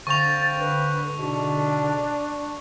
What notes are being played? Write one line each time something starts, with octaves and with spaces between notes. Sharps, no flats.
D3 C4 F5 G5 C#6 A6 F7
B4
G#2 B2 D4